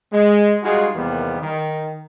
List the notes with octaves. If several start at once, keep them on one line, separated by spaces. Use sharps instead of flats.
G#3
G3 G#3 D#4 F4 F#4 G#4
E2 C3 D#3 G3 A#3 B3
D#3